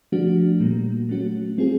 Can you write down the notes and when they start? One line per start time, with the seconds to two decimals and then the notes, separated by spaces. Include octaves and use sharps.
0.12 F3 A3 D4 F#4
0.60 A#2 G3 A#3
1.09 F#3 A3 C#4 F#4
1.58 G3 C4 F4 G#4